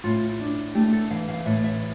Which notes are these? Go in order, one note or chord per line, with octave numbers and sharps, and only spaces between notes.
A2 F4
D4
A3 G4
A4
E3 F5
F5
A2 E5
E5